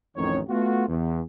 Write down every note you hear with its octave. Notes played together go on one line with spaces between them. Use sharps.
A1 F2 D#3 C#5
A3 B3 F4 F#4
E2